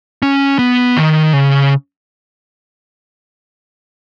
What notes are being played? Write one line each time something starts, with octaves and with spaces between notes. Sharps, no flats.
C#4
B3
D#3
C#3